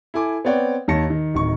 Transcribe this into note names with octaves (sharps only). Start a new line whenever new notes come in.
E4 A4 G#5 D6
B3 C4 C#5 D5 F#5 G5
D#2 D#3 C#5 A5 A#6 C#7
D#3
D1 D#3 C#6